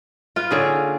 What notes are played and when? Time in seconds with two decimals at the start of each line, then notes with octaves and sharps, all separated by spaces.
0.36 F4 B4 F5
0.51 D3 A#3 C#4 D#4 G#4